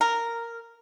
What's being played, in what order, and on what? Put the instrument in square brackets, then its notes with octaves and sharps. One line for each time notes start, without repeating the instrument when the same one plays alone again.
[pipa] A#4